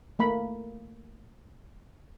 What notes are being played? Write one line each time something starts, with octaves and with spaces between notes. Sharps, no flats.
A3 A#3 B5